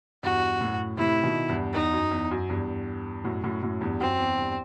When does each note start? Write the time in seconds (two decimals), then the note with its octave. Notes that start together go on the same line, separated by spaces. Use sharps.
0.23 E2 G2 F#4
0.61 F#2 A2
0.98 A2 C3 E4
1.23 B2 D#3
1.49 E2 G2
1.74 E2 D#4
1.93 F#2
2.11 E2
2.31 F#2
2.49 E2 G2
3.24 F#2 A2
3.44 F#2 A2
3.62 F#2 A2
3.81 E2 G2
4.01 F#2 C4
4.18 E2
4.38 E2 G2